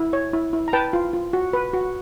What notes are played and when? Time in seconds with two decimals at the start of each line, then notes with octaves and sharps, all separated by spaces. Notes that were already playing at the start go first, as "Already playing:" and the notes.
Already playing: E4
0.13 C#5
0.33 E4
0.53 E4
0.68 A#5
0.73 B4 G5 A5
0.93 F4
1.13 F4
1.33 F#4
1.53 B4
1.74 F#4